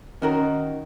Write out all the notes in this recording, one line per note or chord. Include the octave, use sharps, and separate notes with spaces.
D#3 C#4 F#4 A#4